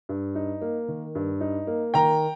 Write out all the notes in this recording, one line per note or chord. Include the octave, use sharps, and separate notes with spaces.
G2
D#4
A#3
D#3
G2
D#4
A#3
D#3 G5 A#5